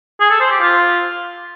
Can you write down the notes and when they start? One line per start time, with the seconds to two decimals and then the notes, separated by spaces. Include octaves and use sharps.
0.20 G#4
0.30 A4
0.41 C5
0.51 G4
0.61 F4